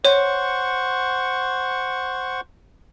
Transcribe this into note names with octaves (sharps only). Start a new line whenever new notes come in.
C5 C#5 F#5 C#6